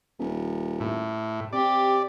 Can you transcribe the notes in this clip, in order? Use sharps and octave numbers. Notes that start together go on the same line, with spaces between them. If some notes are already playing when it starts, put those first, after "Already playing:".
D#1
A2
C3 G4 D5